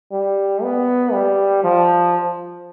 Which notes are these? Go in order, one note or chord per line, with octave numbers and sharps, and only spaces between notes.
G3
B3
G3
F3